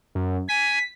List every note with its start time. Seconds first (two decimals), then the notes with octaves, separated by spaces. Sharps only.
0.15 F#2
0.49 G#5 B6